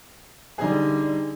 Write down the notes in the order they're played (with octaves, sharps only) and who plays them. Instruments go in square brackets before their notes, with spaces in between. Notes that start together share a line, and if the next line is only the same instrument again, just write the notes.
[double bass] D3 G3 [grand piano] D#4 G#4